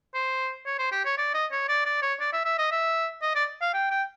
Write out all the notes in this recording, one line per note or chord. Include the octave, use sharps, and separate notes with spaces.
C5
C#5
C5
G4
C#5
D5
D#5
C#5
D5
D5
C#5
D5
E5
E5
D#5
E5
D#5
D5
F5
G5
G5